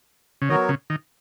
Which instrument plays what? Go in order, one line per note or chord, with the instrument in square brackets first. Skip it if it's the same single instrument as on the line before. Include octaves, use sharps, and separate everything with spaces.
[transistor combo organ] C#3
[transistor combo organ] D#3 [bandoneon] F#3 B3 F#4 A#4 C#5
[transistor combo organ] C#3
D#3